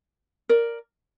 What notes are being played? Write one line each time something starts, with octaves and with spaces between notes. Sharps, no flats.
A#4 D5